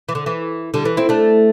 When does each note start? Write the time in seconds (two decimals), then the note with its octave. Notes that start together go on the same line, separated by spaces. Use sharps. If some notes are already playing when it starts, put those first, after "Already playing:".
0.09 E3
0.15 D3
0.26 E3
0.74 D3 G3
0.85 E3
0.97 C4 E4
1.09 A3 D4